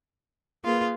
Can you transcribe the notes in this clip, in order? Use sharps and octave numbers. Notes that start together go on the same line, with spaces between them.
A#3 F4 G#4 B4